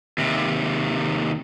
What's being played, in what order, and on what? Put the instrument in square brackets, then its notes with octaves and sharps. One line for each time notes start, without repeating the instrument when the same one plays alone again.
[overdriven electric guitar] D#2 C3